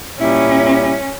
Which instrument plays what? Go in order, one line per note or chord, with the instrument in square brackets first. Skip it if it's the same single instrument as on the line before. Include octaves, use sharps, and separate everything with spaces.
[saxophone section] A#2 G3 E4 [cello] C#4